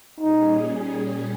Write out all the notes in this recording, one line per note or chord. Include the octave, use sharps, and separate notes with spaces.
A#2 G3 C#4 D#4 G#4